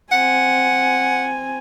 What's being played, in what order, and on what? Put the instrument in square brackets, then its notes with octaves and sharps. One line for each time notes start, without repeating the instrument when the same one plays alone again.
[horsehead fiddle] C4 G#5 [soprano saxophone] F#5